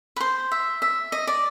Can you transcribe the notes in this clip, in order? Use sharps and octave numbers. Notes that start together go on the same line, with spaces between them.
B4
C5
E5
E5
D#5
D5